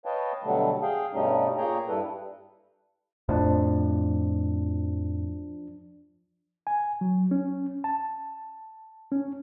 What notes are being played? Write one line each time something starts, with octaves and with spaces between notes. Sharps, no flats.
B4 C#5 D#5 F5 G5 A5
B2 D3 F#3 G3 A3
G#4 F5 G5
G2 B2 G3 A3 C#4 D#4
A#2 A#3 G#4 C#5 G5 A#5
G2 G3 E4 A4 B4
F2 A2 F3 D4
G#5
F#3
C#4
A5
C#4